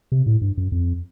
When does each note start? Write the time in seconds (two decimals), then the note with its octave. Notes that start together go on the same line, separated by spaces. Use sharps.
0.12 C3
0.26 A2
0.42 G2
0.57 F#2
0.72 F2